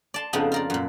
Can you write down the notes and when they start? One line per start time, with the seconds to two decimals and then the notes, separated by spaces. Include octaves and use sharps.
0.14 D5 A5 C6
0.33 F2 C#3 F3 B3 D4 D#4
0.52 F4 A#4 D5
0.70 F#2 A#2